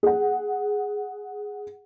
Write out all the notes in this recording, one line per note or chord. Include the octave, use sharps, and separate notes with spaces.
G#4 F#5